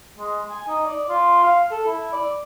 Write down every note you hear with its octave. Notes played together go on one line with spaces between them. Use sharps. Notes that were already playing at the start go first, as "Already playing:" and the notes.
G#3
G#5
D#4
D5
F4
F5
A4
E4
D5